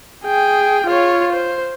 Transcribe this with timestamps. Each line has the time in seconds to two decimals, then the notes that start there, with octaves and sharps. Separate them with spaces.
0.25 G#4 G5
0.87 F4 C#5
1.33 C5